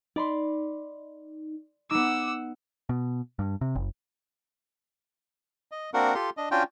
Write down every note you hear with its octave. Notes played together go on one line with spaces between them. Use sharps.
D#4 D5 B5 C6
B3 D#4 F#5 D6 E6
B2
G2
C3
F#1
D#5
A#3 C4 D4 F#4 A#4 F#5
F4 G4 A4 C6
D4 D#5
C#4 D4 F4 F#4 G5